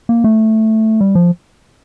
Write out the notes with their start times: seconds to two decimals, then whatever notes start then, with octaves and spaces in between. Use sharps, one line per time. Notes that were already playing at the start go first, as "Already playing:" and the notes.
0.09 A#3
0.24 A3
1.01 G3
1.15 F3